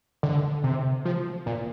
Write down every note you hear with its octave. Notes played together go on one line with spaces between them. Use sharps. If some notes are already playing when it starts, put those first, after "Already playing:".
D3
C3
F3
A#2